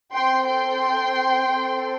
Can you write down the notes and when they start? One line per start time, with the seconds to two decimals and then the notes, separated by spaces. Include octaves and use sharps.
0.13 C4 A4 G5 C6
0.48 G5 C6
1.52 C4 A4